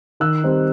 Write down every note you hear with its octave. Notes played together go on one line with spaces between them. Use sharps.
D#3 E6 F#6
G3 C4 D#4